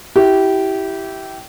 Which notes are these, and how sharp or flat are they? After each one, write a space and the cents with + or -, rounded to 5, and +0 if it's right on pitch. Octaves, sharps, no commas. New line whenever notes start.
E4 -5 G4 -20